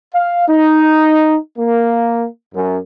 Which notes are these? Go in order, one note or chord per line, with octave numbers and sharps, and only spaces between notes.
F5
D#4
A#3
F#2